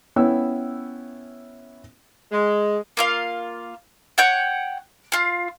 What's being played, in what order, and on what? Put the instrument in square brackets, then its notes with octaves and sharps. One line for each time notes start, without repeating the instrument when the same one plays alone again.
[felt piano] B3 C#4 E4 G5 E6
[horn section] G#3
[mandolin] A#3 F4 F5
C#5 F#5 G5 G6
F4 F5